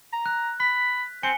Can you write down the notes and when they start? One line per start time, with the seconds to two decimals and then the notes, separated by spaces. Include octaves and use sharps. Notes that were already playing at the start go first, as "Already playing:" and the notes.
0.13 A#5
0.26 F#6
0.60 B5 B6
1.23 C4 G#5 C#7 G7